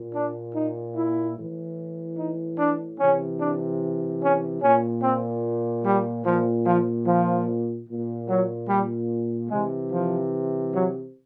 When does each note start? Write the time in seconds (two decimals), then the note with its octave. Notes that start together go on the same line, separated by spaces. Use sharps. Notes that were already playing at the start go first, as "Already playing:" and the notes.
Already playing: A#2
0.14 D4
0.55 D#4
0.96 E4
1.37 A2 E3
2.17 D#4
2.58 D4
3.00 C3 E3 C#4
3.40 D4
4.22 C#4
4.62 A#2 C#4
5.02 C4
5.84 G3
6.25 A#2 F3
6.66 F3
7.06 F3
7.87 A#2
8.29 F#3
8.69 G3
9.50 C3 E3 G#3
9.91 F3
10.73 F#3